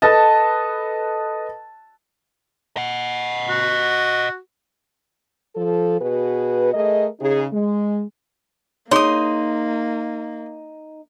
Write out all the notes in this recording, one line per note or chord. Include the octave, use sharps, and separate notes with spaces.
A4 B4 D#5 A5
D#5 F#5
F#4
F3 A4
B2 F#4 G#4 B4
A3 G#4 A#4 D#5
C#3 D#4 G#4
G#3
A#3 D#4 G#4 C#5 C6 D#6